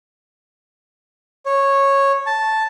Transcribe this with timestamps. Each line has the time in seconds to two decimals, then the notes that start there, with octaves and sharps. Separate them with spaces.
1.46 C#5
2.26 A5